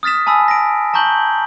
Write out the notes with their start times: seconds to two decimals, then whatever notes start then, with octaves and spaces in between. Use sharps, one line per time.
0.03 D#6 F6 A6 B6 E7
0.27 G#5 A5 B5 D#6 E6
0.48 A#6 D7
0.94 A5 A#5 C#6 G6 F#7 G7